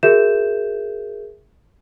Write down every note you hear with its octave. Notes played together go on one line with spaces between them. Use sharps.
F#4 G#4 A#4 E5 G6 E7